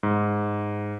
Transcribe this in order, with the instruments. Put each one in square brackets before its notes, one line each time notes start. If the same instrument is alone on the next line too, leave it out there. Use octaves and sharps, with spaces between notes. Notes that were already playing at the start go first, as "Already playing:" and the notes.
[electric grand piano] G#2